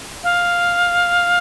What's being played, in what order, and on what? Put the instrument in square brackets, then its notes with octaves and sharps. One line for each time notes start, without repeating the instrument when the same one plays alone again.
[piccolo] F5